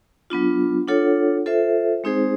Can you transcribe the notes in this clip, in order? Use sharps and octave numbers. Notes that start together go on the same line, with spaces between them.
F#3 B3 D4 F4
D4 F4 A4 C#5 F#5
F4 A4 C5 E5
G#3 C4 D#4 G#4 C5